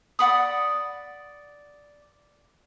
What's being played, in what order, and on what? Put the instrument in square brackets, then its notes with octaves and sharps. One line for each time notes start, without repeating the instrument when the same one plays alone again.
[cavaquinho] D5 F#5 B5 D#6